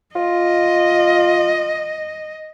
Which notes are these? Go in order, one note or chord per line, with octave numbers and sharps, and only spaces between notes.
F4 D#5